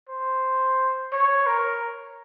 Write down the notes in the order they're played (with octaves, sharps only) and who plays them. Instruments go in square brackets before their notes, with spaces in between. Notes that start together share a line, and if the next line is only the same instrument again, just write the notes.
[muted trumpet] C5
C#5
A#4